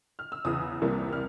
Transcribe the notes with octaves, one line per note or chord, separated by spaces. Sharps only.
F6
E6
E2 C#3 E3 D#6
C2 C3 E3 G3 A#3
F6